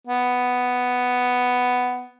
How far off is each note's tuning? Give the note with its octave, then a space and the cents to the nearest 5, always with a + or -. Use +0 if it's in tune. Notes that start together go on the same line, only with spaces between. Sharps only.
B3 +5